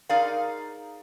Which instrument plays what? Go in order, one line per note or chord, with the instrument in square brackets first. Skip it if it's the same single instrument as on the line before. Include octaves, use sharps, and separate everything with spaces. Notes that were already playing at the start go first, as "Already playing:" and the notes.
[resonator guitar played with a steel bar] D#4 G#4 A#4 D5 F5